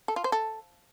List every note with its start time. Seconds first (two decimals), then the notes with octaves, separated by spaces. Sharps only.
0.08 A4
0.16 F4
0.24 C5
0.32 A4